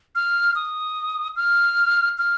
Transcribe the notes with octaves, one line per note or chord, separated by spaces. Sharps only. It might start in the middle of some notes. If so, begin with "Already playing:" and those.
F6
D#6
F6
F6